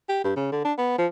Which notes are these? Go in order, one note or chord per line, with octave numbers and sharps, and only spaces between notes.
G4
G2
C#3
D3
D4
B3
F3